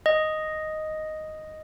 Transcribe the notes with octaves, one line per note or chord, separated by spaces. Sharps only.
D#5